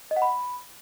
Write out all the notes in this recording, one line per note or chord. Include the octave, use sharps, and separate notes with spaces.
D#5
F#5
B5